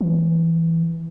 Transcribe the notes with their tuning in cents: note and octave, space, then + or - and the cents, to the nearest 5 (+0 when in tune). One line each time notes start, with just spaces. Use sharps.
E3 +0